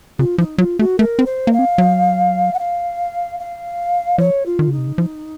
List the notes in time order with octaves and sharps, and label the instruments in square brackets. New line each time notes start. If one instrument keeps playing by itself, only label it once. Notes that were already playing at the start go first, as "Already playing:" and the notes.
[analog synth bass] C#3 [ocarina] F4
[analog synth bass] F3 [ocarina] D#4
[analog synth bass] F#3 [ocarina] F4
[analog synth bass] A3 [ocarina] F#4
[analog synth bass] A3 [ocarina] A#4
[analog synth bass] C4
[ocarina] C5
[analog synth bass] A#3
[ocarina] F5
[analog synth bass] C4
F#3
[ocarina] F#5
F5
F5
[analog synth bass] F3 [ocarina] C#5
[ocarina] F4
[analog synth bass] D#3
[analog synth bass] C#3 [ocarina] D#4
[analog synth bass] C3
C#3
F3